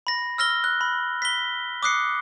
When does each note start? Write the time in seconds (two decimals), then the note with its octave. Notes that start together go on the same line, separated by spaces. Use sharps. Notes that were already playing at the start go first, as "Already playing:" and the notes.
0.07 B5 A#6
0.38 E6 F6 A#6 G7
0.64 F#6
0.81 B5
1.22 B6 G7
1.83 D6 D#6 F#6 C7 C#7